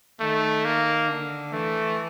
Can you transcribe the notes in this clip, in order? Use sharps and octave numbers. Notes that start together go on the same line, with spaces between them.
D#3 A3
A#3
D3
E3 A3